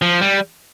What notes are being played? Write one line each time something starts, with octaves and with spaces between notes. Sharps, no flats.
F3
G3